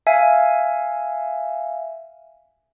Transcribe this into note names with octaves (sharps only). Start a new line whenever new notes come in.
E5 F5 G#5